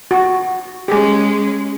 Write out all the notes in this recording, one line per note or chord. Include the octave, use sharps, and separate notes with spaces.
F#4
G#3 C#4 G4 G#4